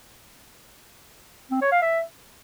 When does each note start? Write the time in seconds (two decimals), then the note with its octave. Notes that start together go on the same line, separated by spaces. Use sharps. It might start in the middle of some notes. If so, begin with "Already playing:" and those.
1.51 C4
1.61 C#5
1.72 F5
1.82 E5